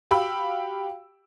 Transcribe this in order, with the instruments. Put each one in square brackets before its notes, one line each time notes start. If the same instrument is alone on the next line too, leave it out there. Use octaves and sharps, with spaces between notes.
[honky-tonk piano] F#4 G4 F5 G5 B5 E6